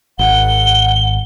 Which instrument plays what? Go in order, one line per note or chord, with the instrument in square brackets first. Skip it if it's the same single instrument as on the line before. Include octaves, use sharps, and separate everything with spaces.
[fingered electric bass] G#1 [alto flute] F#5 [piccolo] G7